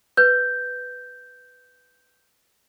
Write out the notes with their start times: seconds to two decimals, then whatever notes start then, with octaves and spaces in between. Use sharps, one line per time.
0.17 B4 G6